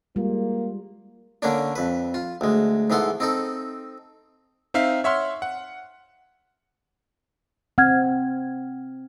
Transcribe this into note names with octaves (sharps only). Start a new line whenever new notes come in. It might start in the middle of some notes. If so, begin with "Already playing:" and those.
G3 G#3 A#3 F4
D3 A#3 C#4 D4
F2 B4
F4
D2 G#3
G#2 E3 B3 A4 C6
C4 D#4 A4
C4 D#4 E5 F5 C7
C#5 E5 F#5 C6 F6
F#5
C4 F#5 F6 G#6